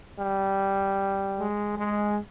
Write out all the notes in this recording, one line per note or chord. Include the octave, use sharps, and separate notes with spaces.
G3
G#3
G#3